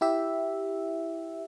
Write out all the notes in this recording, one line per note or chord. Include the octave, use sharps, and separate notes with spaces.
E4 G4 E5